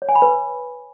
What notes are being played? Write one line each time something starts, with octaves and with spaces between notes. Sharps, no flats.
C#5
G#5
B5
B4